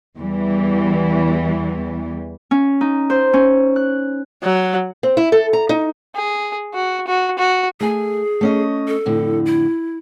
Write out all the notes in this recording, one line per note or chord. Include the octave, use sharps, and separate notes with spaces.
E2 E3 G3
C#4
D#4
C5
C#4
F#6
F#3
C4
E4
A4
A#5
D#4
G#4
F#4
F#4
F#4
A3 G#4 G#5
A3 C#4 D#5
A4
F2 A2 D3
E4